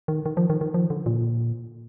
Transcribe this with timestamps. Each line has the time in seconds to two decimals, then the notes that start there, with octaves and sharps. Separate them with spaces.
0.08 D#3
0.26 D#3
0.37 F3
0.50 D#3
0.61 D#3
0.74 F3
0.90 D3
1.06 A#2